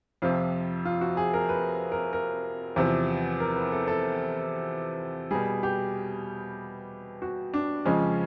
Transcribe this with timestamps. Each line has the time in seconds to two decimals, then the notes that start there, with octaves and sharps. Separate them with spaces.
0.22 F2 C3 F3 F4
0.85 F4
1.01 F#4
1.17 G#4
1.34 A#4
1.49 B4
1.92 A#4
2.13 A#4
2.76 E2 C3 F3
3.40 A#4
3.56 B4
3.72 A4
3.88 A4
5.31 B2 G3 G#4
5.63 G4
7.22 F#4
7.54 D4
7.85 F2 C#3 F3 G#3 C#4